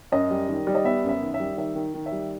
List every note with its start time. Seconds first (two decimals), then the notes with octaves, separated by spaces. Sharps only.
0.12 F#2 D#5
0.30 G3
0.48 D#3
0.67 G3
0.75 D#5
0.85 B3 E5
1.04 F#2
1.09 E5
1.21 D#3
1.34 E5
1.40 G3
1.57 D#3 E5
1.75 D#3
1.94 D#3
2.06 E5
2.12 G3